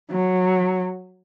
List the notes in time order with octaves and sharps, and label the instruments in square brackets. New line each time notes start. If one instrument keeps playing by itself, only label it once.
[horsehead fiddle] F#3